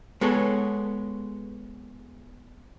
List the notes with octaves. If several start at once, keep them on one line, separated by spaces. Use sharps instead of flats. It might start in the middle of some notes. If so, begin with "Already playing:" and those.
G#3 B3 A4 C#5